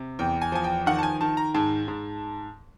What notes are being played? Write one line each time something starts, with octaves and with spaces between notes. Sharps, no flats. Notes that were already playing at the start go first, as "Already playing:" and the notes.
Already playing: C3
E2 G5
G#5
F3 G#5
G5
D#3 F#5
A5
G#5
D#3 A5
A#5
G#2 A5
G#2